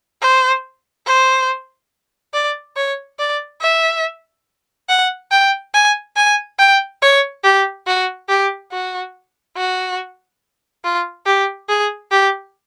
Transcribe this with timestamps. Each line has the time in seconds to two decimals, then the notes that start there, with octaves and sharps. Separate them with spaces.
0.21 C5
1.07 C5
2.34 D5
2.77 C#5
3.19 D5
3.61 E5
4.89 F#5
5.31 G5
5.74 G#5
6.16 G#5
6.59 G5
7.02 C#5
7.44 G4
7.87 F#4
8.29 G4
8.72 F#4
9.57 F#4
10.84 F4
11.26 G4
11.69 G#4
12.12 G4